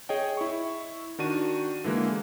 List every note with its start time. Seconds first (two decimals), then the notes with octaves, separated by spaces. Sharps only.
0.09 G#4 C#5 D#5 G5
0.37 E4 C#6
1.19 D#3 D4 F#4 D#7
1.84 D3 E3 G#3 A#3